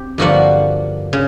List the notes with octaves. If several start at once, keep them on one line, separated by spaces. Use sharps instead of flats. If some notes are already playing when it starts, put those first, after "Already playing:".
Already playing: C4 G4
G2 D3 F3 A#3 F#4 F#5
C#3